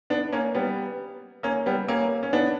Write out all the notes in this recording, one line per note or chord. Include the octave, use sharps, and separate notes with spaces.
B3 D4
A#3 C#4
G3 B3
A#3 C#4
G3 B3
A#3 C#4
C#4
B3 D4